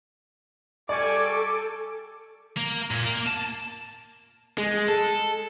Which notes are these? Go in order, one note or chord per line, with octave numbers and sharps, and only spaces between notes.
G3 A4 D5 G#5 C#6 D6
A#3
A#2
A#3
A5
G#3
A4